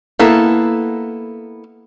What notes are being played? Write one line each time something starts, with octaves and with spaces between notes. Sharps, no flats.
A#3 B3 E4 A4